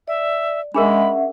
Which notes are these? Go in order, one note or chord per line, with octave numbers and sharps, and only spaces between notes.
D5 E5
G#3 C#4 D4 G#4 A#4 E5 F#5 B5